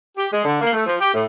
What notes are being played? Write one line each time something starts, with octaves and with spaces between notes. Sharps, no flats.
G4
G#3
D3
A#3
A3
F3
G4
A2